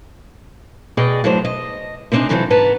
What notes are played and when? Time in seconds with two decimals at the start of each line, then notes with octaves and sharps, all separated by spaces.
0.97 B2 G#4 D5 D#5 G5
1.24 A2 F#3 D4 C5
1.45 D#5
2.12 C3 B3 C4 D4 D#4 G#4
2.29 C3 E3 F#3 C4 F4 A4
2.50 G#2 B3 B4 A5 A#5